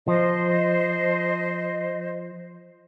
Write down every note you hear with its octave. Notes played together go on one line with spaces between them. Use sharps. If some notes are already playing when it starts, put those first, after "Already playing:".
F3 C5 D#5